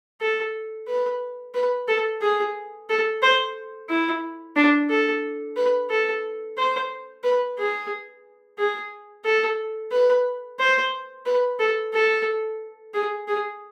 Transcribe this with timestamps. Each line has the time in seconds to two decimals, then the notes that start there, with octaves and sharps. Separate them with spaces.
0.21 A4
0.87 B4
1.54 B4
1.88 A4
2.21 G#4
2.89 A4
3.22 C5
3.89 E4
4.56 D4
4.90 A4
5.57 B4
5.90 A4
6.58 C5
7.24 B4
7.58 G#4
8.58 G#4
9.25 A4
9.92 B4
10.59 C5
11.26 B4
11.59 A4
11.93 A4
12.94 G#4
13.28 G#4